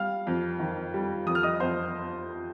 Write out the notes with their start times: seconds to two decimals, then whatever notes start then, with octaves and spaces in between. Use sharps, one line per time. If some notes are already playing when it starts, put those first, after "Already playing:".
Already playing: G3 F5 F6
0.27 F2
0.59 D#3
0.94 G3
1.27 F2 D#6
1.35 F6
1.43 D#5 D#6
1.60 F2 C5 C6